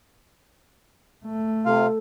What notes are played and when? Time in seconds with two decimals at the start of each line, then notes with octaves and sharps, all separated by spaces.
1.25 A3
1.66 C3 F4 A4 F5